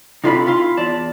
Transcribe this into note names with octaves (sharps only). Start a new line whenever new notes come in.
C3 D#4 F4 A4 D#5 B5
E4 F4 E5 F5 C6
E2 D5 A5